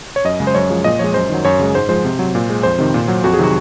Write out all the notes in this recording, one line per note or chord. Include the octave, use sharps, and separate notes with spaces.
C#5
F#2 D#5
C#3 G#3
C5
F#2 C#5
F3 G#3
A#2 D#5
F3 G#3 C#5
F#2 C5
D#3 F#3
F#2 C#5
C#3 G#3
G#2 C5
F3 G#3 C5
C3
F#3
A#2
G#3
F2 C5
C3 D#3
A#2
F#3
F2 F#4
G#4
C3 D#3 F#3 F#4